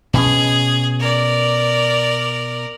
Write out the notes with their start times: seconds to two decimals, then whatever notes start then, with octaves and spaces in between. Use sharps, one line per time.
0.14 B2 C#4 G#4
0.99 A#4 D5